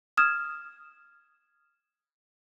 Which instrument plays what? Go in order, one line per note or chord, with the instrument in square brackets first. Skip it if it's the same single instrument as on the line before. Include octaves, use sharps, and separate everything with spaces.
[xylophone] D#6 F6 G#6 E7